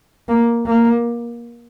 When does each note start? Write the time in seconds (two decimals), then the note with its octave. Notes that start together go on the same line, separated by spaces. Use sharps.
0.29 A#3
0.66 A#3